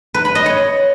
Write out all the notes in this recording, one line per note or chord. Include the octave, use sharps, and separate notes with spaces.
B4
B5
D#5
C#5